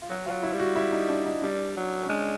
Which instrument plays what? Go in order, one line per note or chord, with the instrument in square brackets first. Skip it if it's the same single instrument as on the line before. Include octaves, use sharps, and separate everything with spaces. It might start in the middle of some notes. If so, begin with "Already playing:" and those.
[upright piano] F4
[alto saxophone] F#3 [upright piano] F#4
[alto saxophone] F3 [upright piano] F4
[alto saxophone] F#3
[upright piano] E4
[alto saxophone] G3
[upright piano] F#4
E4
D#4
D4
D#4
[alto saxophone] G3 [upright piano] D4
[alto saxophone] F#3
[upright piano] C#4
[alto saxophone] G#3 [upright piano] D4